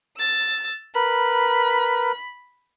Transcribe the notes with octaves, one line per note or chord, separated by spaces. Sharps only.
E6 A6
A#4 B4 B5